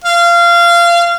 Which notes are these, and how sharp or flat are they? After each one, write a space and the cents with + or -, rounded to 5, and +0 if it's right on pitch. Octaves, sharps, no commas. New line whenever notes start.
F5 -25